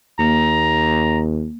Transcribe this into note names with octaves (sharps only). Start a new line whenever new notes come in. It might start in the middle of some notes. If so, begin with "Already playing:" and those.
D#2 A#3 A#5